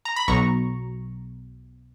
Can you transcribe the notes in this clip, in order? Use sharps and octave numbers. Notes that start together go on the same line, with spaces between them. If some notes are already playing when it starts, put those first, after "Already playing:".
A#5
B5
B1 B2 F#3 A#5 C#6